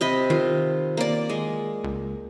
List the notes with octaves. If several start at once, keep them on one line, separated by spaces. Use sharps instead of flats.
C3 D#5 B5
D#3 F4
A#3 D5
G#3
C#2